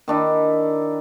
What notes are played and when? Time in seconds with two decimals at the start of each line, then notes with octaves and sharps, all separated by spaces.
0.08 D#3 D4 E4